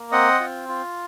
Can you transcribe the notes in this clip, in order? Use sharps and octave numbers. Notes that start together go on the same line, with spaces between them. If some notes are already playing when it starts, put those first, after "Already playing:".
Already playing: A#3
C4 D#5 F#5
F4
F4